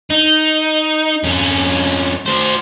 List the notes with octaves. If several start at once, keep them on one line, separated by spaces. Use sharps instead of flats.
D#4
F2 C#4
F#4 C5